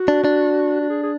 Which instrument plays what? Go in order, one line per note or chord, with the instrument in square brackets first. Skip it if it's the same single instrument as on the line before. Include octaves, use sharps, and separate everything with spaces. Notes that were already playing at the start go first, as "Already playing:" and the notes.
Already playing: [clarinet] F#4
[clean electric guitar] D4
D4
[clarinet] F#4
G#4
G#4